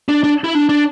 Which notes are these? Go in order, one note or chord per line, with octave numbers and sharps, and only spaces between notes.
D4
D4
E4
D4
D4